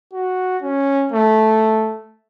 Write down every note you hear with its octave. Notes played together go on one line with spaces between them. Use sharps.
F#4
C#4
A3